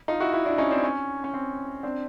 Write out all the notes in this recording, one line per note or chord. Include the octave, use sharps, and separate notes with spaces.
D#4 F4
E4 F#4
E4 F#4
D4 E4
C#4 D#4
C4 D4
C#4
C#4
C4
C4 D4